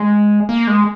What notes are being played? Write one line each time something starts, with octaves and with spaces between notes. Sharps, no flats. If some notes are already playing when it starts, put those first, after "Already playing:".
Already playing: G#3
A#3
G#3